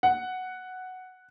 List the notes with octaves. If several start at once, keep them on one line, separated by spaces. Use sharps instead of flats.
F#5